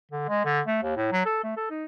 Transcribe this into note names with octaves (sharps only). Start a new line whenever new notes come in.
D3
G#3
D3
A3
D#2
A2
F#3
A4
A3
A4
D#4